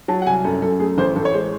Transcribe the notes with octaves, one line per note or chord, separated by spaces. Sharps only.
F#3 A5
F#5
C2 G#5
F#2 A4
F#2 A4
A3 G#4
A1 C5
A1 A4
C#5
G#3 C5